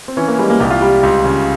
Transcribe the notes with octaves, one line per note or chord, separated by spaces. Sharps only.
C4
E3 C#4
A#3
G3 G#3
A#3
C2 G4
F4
G3 G4
C#2
C#3